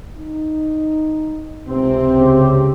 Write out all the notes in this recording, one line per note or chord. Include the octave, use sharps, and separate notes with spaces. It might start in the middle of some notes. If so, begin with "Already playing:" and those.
D#4
C#2 C3 C4
C#3 G4